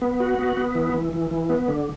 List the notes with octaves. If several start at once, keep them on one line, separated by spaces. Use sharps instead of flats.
B3
F#4
B3
B3
E3
E3
E3
E3
B3
D3